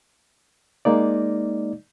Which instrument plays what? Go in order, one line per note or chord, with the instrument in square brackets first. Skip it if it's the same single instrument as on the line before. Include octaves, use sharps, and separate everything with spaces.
[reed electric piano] G#3 A#3 D#4 D5